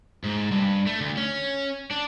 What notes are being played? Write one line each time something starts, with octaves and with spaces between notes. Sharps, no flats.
G#2
G2
A3
D2
C#4
D4